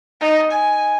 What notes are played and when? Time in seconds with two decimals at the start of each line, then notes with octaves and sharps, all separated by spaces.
0.21 D#4
0.52 G#5